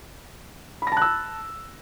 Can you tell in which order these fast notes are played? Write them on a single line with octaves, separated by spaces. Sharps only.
B5 A#6 A5 F#6 E6